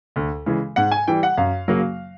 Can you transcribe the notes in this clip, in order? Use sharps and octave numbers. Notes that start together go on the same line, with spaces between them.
D2
C#3 E3 G#3
G#2 F#5
G#5
E3 G3 G5
F#5
F#2 F5
C#3 F#3 A#3